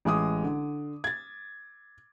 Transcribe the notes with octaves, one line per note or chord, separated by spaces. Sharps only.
A1 G#3 D6 D#6
D3
G#6 A6